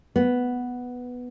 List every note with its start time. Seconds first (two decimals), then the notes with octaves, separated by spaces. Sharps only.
0.16 B3